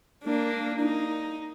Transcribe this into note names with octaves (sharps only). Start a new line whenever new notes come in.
A#3 D4
D#4